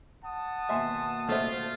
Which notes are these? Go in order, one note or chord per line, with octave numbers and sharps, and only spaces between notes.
F#5 A5 D#6
B2 D#3 A#3 E5 G#5 C6
A3 F4 C5 E5